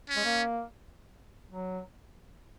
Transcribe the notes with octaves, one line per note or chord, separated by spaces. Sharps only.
C#4
G#3
A#3
F#3